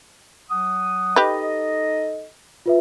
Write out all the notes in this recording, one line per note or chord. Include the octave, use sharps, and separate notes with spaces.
F#3 F#5 D#6
D#4 G4 A4 B4 D#5
F4 B4 E5